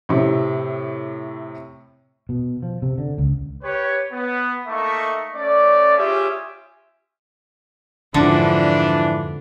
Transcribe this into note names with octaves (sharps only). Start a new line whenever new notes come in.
A2 C3
B2
F3
C3
D3
C#2
G4 B4 C#5
B3
A3 A#3 D#4 E5 C#6
A3 C#4 D5
C#4 F4 G4 G#4 E5
F2 G#2 D3 E3 F3 D4